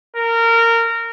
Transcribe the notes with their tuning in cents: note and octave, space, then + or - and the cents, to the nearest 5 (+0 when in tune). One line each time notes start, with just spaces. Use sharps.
A#4 -20